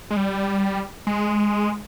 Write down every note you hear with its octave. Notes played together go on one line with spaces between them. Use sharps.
G#3
G3
G#3